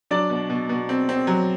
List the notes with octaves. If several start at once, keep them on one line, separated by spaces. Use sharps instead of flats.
F#3 D4 D5
B2
B2
B2
C4
C4
F#3